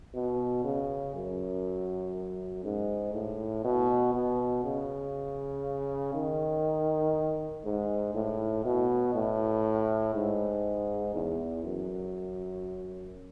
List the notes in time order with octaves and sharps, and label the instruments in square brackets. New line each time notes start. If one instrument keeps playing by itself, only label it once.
[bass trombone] B2
C#3
F#2
G#2
A2
B2
B2
C#3
D#3
G#2
A2
B2
A2
G#2
E2
F#2